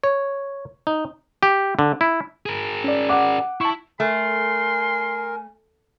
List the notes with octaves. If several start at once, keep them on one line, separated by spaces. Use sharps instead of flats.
C#5
D#4
G4
D3
E4
G#4 A#4
C#4 D5
F#5 D6
E4 A5 C#6
A3 A#4 G#5 C6